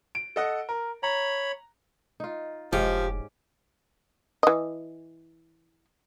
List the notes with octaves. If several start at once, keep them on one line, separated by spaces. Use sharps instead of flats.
D7
A4 D#5 F#5
A#4
C#5 A#5 B5
D#4 F4
F1 G#2 F3 C#4 G4
E3 D#5